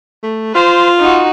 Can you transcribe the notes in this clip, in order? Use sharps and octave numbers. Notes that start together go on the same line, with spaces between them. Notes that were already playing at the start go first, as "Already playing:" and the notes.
A3
F4 C5
D#4 F#4